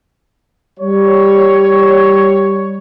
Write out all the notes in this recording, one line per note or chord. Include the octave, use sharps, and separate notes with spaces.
G3 C#5